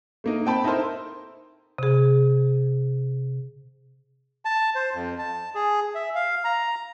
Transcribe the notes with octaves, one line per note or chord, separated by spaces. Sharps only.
A3 A#3 D#4
C4 G5 A5 B5
D#4 E4 A4 A#4 C5
C3 G#4
A5
C5
F2
A5
G#4
E5
F5
A#5